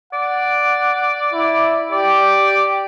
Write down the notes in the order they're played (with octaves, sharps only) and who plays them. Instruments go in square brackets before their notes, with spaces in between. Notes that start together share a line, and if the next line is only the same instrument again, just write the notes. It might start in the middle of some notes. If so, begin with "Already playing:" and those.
[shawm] D5 [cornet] F#5
[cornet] E4
[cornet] G4 [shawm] D5